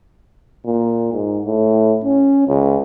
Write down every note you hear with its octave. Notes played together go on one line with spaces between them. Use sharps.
A#2
G#2
A2
C#4
C#2